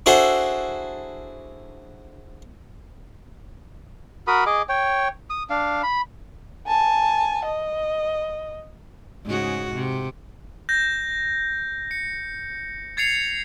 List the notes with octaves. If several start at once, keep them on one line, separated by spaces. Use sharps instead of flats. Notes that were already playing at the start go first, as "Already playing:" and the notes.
D4 E4 F#4 G#4 A4 C5
F#4 A#4 B5 D#6
G#4 D#5 D6
C#5 G5
D#6
D4 F5
B5
G#5 A5
D#5
G#2 C#3 F#4
C3
G6 A#6
C#7
G#6 A6 C7 C#7 F7